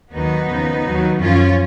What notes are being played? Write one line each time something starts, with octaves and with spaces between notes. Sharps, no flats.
D#2 D#3 F#3 B3 D#4
D#2 C#3 F3
D#2 D#3 F#3
F#2 F3 C#4 F4